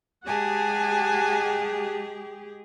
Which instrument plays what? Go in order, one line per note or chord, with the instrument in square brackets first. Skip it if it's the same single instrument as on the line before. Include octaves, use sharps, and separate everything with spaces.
[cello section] G#3 G4 G#4 [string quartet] F#5 G#5 A5